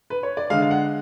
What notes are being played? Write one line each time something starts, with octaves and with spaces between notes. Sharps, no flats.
B4
C#5
D5
D3 G#3 F5
F5
F#5